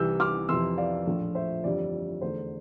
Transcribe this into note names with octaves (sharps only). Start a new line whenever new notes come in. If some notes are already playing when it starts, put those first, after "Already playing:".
Already playing: C2 C3 E3 E6 G6
D6 F6
F2 C3 E3 C6 E6
D5 F5
A#1 A2 F3 A3
C5 E5
G1 F2 E3 G3 D5
E2 D3 A3 C5